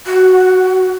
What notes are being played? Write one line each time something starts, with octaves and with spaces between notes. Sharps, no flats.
F#4